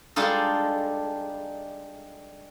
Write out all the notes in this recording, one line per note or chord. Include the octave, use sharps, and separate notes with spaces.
G3 G#3 D4 D#4 F4 A4